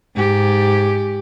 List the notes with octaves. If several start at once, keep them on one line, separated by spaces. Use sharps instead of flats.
G#2 G4